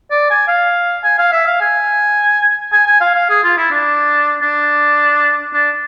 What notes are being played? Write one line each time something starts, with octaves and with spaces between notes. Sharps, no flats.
D5
G#5
F5
G#5
F5
E5
F5
G#5
G#5
G#5
F5
F5
G#4
F4
E4
D4
D4
D4